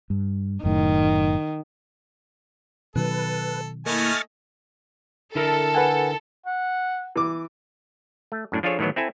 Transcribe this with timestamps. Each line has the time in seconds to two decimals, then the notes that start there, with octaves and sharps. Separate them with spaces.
0.10 G2
0.64 F#1 F#2 A2 D#3
2.96 B2 D#3 F#3 A4 B4
3.86 A3 A#3 E4 D#5 G#5 C#6 F6 A6
5.35 D3 E4 A4 A#4
5.75 B4 F#5 G#5
6.46 F#5
7.16 E3 D6
8.32 A3
8.52 F#2 A2 D4
8.63 F3 D4 F4 G#4 A4 C#5
8.79 A2 D#3 E3 F#3 B3
8.96 C4 E4 A4 G#5